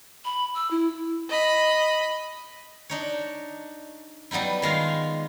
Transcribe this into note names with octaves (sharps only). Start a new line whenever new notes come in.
B5
E6
E4
D#5 B5
D4 D#4 C#5
F#3 G3 B3 D#4 E4
D#3 G#3 F4 F5